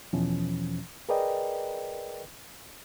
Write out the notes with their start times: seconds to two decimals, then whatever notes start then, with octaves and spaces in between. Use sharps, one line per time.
0.13 E2 B2 E3 F3 C#4
1.09 G#4 A#4 B4 D5 D#5 G5